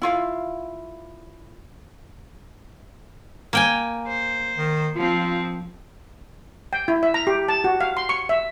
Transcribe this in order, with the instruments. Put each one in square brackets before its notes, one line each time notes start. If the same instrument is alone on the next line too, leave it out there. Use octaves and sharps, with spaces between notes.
[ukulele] E4 F4 F5
[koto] A#3 G5 G#5
[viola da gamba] C5
[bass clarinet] D#3
[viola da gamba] F3 C4 [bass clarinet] F4
[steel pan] G5
E4
E5
A#5
G4
A5
F#4
F5
C6
C#6
E5